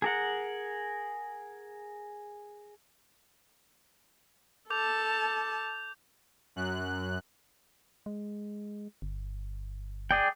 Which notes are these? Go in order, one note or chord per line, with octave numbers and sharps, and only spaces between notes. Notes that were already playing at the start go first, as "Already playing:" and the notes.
G#4 A#4 F#5
A4 A5 D6 G6 F7
F#2 F#6
G#3
G1
G#4 D5 G5